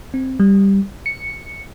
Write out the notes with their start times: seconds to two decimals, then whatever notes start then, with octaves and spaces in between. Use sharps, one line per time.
0.14 C4
0.40 G3
1.06 C#7